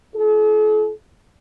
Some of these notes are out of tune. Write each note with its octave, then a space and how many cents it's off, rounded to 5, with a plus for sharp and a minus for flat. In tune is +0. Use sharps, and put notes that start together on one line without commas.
E4 +45 A4 -45